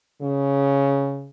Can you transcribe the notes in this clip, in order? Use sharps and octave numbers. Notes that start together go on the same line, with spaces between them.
C#3